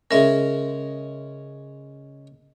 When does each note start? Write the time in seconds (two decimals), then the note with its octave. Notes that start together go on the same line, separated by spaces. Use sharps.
0.11 C#3 G#3 C#4 A#4 E5